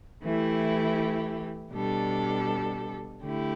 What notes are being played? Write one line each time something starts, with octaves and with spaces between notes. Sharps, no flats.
E3 A3 E4 G4
B2 G3 D4 A4
D3 A3 E4 G4